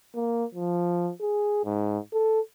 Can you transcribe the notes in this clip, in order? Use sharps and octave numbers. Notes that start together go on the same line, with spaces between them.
A#3
F3
G#4
G#2
A4